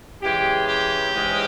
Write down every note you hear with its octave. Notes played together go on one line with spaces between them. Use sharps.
C#3 E3 G#3 G4
G4
G#2 E3 G#3 C#4